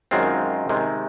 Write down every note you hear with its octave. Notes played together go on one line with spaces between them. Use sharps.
F#2 D#3 G#3 C4 F4
C3 D#3 G#3